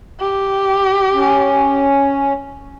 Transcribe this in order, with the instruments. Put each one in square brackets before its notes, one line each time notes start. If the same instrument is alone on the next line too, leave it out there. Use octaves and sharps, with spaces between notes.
[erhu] G4
[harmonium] C#4